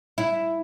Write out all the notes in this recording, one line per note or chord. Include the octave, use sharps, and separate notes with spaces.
E4